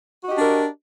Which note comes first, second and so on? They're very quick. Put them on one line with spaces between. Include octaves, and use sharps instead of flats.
F#4 D#5 G4 D4 A#4